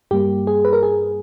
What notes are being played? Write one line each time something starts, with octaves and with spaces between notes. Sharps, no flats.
G2 G3 A#3 G4
G#4
B4
A#4
G#4